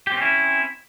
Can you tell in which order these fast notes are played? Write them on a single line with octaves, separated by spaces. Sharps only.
G4 C4 C#4 E4